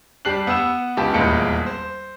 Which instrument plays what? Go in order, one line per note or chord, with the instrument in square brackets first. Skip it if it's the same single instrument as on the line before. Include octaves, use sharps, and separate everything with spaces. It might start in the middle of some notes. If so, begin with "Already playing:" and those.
[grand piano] G3 G4 A5 F#6 C7 F#7
B3 F#5 E6 E7
C#2 G4 A5
D#1 E2 G#3 A#3 C#7
C5